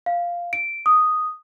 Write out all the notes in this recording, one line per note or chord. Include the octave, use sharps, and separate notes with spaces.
F5
D7
D#6